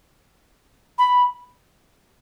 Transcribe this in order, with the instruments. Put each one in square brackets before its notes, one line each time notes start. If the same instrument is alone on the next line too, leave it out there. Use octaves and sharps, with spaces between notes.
[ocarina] B5